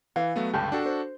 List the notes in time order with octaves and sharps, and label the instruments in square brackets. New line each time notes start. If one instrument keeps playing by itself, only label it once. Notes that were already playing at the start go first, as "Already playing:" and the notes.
[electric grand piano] E3 [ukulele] F5
[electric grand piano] F#3 A3 B3
[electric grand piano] C#2 G2 D3 [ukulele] G4 A5
[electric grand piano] D4 F#4 A4
[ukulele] C5